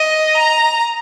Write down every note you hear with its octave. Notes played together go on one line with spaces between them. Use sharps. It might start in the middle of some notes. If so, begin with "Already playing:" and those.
Already playing: D#5
A#5